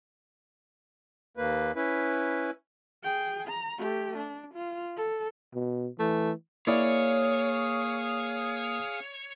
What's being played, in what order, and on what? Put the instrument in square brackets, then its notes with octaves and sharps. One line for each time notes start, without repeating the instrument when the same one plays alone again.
[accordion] D#2 A#3 B4
C#4 E4 B4
[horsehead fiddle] G#4 G5
A#5
A3 G4
D4
F4
A4
[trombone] B2
[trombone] E3 [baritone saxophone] A3
[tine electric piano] A#3 [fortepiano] E4 D5 [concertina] G#4 F5 D#6 [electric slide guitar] C#5